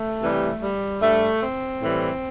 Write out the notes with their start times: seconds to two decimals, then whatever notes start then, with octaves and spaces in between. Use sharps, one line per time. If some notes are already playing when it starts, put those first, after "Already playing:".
Already playing: A3
0.22 C3 E3 G3
0.62 G3
1.01 G2 G3 A3
1.42 C4
1.82 A2 E3 G3